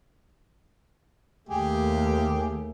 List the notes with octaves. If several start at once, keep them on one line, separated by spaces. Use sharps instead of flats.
D#2 A3 G4 G#4